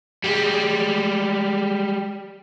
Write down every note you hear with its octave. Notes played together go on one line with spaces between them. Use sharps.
G3 G#3